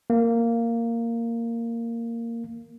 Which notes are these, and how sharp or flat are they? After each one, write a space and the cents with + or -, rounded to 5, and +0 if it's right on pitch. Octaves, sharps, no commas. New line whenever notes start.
A#3 -10